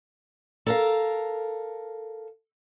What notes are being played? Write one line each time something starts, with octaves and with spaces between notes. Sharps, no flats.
A4 A#4 F5